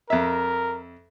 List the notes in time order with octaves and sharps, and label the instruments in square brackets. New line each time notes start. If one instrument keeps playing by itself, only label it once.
[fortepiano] F2 E5 [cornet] A#4